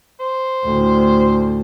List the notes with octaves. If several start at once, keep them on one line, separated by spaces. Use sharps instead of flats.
C5
D2 A2